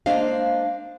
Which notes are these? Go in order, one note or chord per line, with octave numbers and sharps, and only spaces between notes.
G#3 A#3 D4 C5 D#5 F5